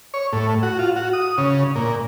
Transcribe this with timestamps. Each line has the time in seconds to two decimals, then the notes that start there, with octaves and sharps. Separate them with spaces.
0.14 C#5
0.33 A2
0.63 F#4
0.79 F4
0.96 F#4
1.13 D#6
1.38 C#3
1.75 A#2